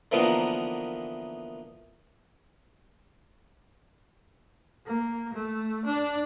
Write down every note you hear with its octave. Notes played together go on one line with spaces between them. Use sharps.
D3 E3 F3 A#3 B3 D#4
A#3
A3
D4